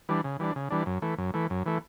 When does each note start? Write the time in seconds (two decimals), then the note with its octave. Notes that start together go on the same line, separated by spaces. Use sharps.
0.09 E3 G3 D4
0.24 C#3
0.39 E3 G3 D4
0.56 C#3
0.70 E3 G3 D4
0.86 F#2
1.02 E3 A3
1.18 F#2
1.34 E3 A3
1.50 F#2
1.66 E3 A3